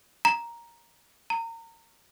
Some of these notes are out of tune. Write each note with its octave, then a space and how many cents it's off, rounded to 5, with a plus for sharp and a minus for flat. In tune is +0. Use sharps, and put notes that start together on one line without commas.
A#5 +5
A#5 -30